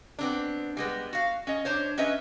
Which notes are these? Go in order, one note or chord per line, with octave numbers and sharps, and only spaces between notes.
B3 C4 D4
G3 G#3 B3
F#4 F5
C#4 D#5
D4 C5 C#5
C#4 B4 D#5 E5